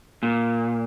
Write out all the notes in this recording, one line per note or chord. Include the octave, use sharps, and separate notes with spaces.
A#2